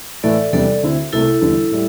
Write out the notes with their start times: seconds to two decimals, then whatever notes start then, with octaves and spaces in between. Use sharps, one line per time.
0.23 A2 E3 A3 A4 D5
0.53 E2 C3 G3 D4 A4 D5
0.83 D2 D3 C4 E4
1.12 C2 C3 A3 E4 A4
1.41 E2 D3 G3 D4
1.71 A2 G3